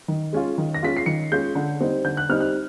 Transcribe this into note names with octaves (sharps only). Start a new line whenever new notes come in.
D#3
G#3 C#4 F4
D#3
A#6
G#3 C#4 F4 B6
C7
D#3 C#7
G#3 C#4 F4 G6
D3
G3 C4 D#4
D3 G6
F#6
G3 C4 D#4 F6
F#6